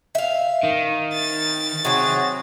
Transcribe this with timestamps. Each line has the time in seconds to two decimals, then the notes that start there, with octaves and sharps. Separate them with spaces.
0.15 E5 F5
0.64 D#3
1.13 A6
1.85 C3 F#3 F#4 G#4